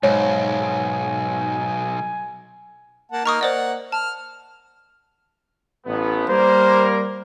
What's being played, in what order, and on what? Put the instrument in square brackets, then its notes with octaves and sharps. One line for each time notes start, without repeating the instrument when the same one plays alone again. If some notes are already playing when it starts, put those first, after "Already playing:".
[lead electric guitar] B1 [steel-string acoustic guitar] G#2 [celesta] C#5 [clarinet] G#5
[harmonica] A#3 F#5 A5
[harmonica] A#3 D#4 F6 [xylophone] A#5 C#6 D#6
[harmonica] A#3 F#5 [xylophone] C5 D5 D#5
[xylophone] A5 [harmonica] F6
[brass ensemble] A1 B3
[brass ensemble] G3 A#3 A#4 [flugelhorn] C5